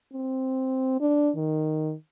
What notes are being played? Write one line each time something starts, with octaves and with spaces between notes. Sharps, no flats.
C4
D4
D#3